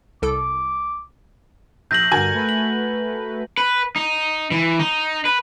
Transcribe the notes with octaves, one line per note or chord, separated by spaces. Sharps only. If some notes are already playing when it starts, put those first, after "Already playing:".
C2 A4 D6 D7
A#1 G6 A#6 F#7
G2 D3 F#4 A#4 G#5
A3 B4
F#7
B4
D#4
E3
D#4
B4